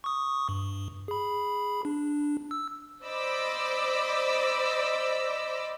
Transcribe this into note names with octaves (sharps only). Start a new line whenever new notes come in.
C#6 D#6
G2
G#4 B5
D4
E6
C5 D5 D#5 B5 D6 E6